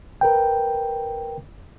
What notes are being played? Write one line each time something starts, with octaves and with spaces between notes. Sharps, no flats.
A#4 B4 G5